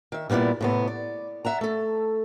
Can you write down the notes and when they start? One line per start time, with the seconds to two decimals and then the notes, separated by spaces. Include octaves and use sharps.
0.12 D#3 E5
0.30 A#2 G3 B3 E4 D5
0.61 A2 C3 B3
0.87 D5
1.45 E5 F#5 A#5
1.61 A3 A4